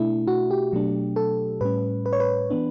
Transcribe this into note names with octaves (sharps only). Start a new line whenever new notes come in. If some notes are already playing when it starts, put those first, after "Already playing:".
Already playing: B2 A3 D4 E4
F#4
G4
B2 F#3 A3 D4
A4
A2 G3 C#4 B4
B4
C#5
B4
E3 B3 D4